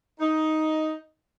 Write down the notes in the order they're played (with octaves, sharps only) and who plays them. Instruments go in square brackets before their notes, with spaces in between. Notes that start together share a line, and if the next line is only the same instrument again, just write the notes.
[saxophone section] D#4